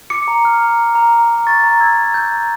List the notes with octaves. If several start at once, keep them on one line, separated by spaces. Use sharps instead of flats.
D6 C#7
A#5
F6
A#5
A#5
A#5
A#5
A#5
C#6 A6
A#5
E6 G#6
A#5
E6 G6
A#5